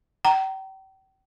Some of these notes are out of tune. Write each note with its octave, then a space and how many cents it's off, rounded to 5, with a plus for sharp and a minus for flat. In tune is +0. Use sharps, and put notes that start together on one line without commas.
G5 -40 A#5 +0